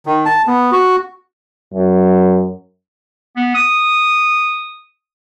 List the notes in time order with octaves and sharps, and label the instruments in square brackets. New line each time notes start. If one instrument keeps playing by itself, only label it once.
[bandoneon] D#3
A5
B3
F#4
[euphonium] F#2
[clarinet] B3
D#6